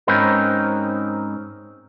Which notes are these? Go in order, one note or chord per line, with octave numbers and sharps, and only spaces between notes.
G#2 C4 C#4 D#4 A#4 B4